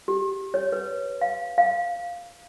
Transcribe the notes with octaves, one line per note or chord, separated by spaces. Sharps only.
G4
C#5
B4
F5
F5